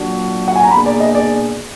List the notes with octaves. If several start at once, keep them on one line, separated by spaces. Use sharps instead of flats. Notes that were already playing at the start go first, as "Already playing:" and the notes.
Already playing: A#2 F#3 D4 F#4
F#5
G#5
A#5
B2 A#3 D4 G#4 B5
D5
D#5
D5